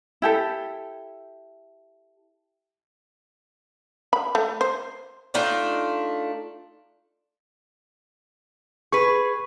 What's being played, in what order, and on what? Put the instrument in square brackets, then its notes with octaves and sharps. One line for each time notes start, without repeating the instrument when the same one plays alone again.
[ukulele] E4 G4 A4
[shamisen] B5
A3
C5
[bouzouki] A3 D4 D#4 F4
[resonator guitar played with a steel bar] G#4 B4 [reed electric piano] C#6